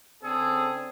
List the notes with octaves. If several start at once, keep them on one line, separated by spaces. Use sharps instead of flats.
C#3 C4 D4 G#4 A4